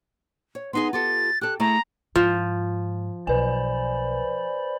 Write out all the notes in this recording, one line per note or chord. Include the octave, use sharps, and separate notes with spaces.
C#5
B3 D#4 G#4 C6
F4 G4 A4 A6
G4 A4 F#6
A3 E4 G#4 A#5
G#2 F3
B1 B4 C5 D5 G#5 B5